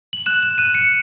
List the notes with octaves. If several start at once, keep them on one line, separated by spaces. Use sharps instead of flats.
F#7
F#6 E7
E7
F#6 D#7
C#7